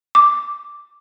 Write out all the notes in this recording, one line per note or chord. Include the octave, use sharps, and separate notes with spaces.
D6